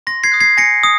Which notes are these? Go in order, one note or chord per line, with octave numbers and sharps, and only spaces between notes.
C6 A#6
G#6 C7
D#6 F#6
G#6 C7
G#5 A#6 C#7
D#6